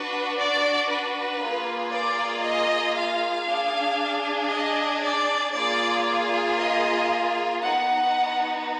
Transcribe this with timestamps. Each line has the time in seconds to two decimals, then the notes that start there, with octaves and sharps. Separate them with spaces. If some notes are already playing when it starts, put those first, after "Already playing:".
Already playing: D4 F#4 B4
0.37 D5
0.88 B4
1.40 A#3 F4 G#4
1.92 D5
2.44 D#5
2.96 F5
3.47 D4 G#4
4.51 D#5
5.03 D5
5.54 A#3 F4 G#4 D5
6.58 D#5
7.62 B3 D#4 F#4 F#5